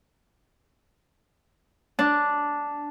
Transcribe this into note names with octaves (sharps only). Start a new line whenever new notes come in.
D4